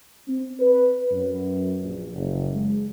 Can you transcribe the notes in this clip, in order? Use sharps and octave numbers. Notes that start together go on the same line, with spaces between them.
C4
B4
F#2
A#1
F#1
G#3